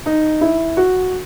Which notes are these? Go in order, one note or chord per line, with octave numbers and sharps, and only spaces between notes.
D#4
E4
F#4